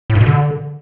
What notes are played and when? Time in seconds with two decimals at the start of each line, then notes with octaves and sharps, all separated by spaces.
0.10 A2
0.15 G2
0.21 B2
0.26 D3